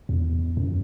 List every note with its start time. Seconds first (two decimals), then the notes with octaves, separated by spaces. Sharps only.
0.09 E2
0.57 F#2